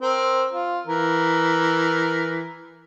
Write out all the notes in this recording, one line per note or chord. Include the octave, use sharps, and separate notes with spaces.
C4 A#4
F4
E3 A#4